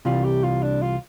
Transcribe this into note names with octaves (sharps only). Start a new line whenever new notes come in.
C2 C3 E3 G3 F4
G4
F4
D4
F4